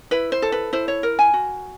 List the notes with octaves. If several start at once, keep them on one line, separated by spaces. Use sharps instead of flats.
E4 B4
C5
A4
B4
E4 C5
C#5
A#4
G#5
F#4